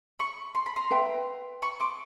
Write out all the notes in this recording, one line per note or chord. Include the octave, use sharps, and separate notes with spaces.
B5 C#6
C6
B5
A#5 C6
B4 E5 G5
B5 C#6
C6 D6